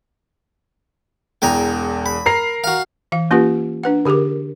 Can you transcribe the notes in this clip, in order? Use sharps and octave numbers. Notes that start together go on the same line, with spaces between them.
E1 E2 G5 G#5 A#5
B5
A#4 A#5 C7
F#4 F5
E3 F5
A#3 C#4 F4 G4 B4
D4 B4 F#5
D3 G4 G#4 A#4 D6